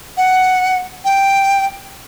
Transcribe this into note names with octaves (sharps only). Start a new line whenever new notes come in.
F#5
G5